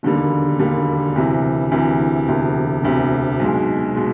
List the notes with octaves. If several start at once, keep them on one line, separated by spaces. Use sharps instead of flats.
E1 D#2 D3 G3
E1 D#2 D3 G3
D2 C3 E3
D2 C3 E3
E1 D2 C3
E1 D2 C3
B1 B2 G#3
B2 G#3